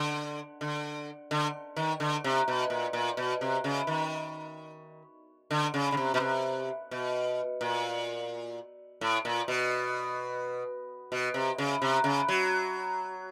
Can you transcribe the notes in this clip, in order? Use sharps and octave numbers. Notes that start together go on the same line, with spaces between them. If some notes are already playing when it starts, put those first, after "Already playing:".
Already playing: D3
D3
D3
D#3
D3
C3
B2
A#2
A#2
B2
C3
C#3
D#3
D3
C#3
C#3
C3
B2
C3
B2
A#2
A2
A#2
B2
B2
C3
C#3
C3
C#3
F#3